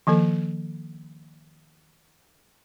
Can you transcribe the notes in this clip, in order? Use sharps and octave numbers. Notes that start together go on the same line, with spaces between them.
D#3 F3 A#3 A4